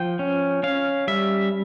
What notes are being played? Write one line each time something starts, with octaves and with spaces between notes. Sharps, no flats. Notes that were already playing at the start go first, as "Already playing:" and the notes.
Already playing: F3 G5
C#4
C#4 F5
G3 E5